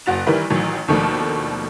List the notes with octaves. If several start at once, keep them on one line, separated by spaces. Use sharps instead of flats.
F#1 F#4 A6 F7
D#3 E3 G3 E4 A#4 B4
A1 D#3 E3 F#3
D#2 B2 D#3 F3 A3 D4